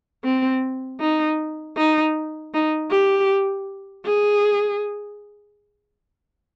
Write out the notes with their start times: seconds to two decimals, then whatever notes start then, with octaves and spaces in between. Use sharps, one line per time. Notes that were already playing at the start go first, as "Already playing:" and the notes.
0.24 C4
1.01 D#4
1.77 D#4
2.54 D#4
2.91 G4
4.06 G#4